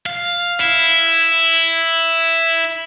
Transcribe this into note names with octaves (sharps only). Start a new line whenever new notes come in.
F5
E4